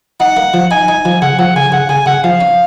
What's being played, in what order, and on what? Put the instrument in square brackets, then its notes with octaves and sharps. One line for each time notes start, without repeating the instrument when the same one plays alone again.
[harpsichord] D#4 [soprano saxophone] F#5
[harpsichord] A#3
F3
[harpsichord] D#4 [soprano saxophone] G#5
[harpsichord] D#4
F3
[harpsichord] C#3 [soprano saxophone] F#5
[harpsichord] F3 [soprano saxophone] F#5
[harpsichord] C#3 [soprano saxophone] G#5
[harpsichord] C#3 [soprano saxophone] F#5
[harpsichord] C#3 [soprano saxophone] G#5
[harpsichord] C#3 [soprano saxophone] F#5
[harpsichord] F3 [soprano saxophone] F5
[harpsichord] C#4